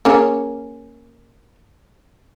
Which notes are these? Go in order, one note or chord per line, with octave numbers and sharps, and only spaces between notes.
A#3 C#4 G#4